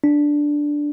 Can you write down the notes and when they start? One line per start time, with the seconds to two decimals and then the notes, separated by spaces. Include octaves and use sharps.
0.04 D4